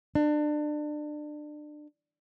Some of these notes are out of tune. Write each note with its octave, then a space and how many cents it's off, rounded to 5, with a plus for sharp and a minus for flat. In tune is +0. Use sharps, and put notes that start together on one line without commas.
D4 +30